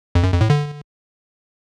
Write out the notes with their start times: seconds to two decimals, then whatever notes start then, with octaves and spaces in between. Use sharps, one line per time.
0.15 F2
0.24 F#2
0.32 F2
0.41 A2
0.50 D3